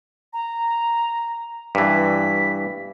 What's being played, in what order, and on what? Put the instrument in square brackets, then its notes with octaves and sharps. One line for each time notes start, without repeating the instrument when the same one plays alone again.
[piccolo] A#5
[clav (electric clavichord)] G2 E3 [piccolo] B6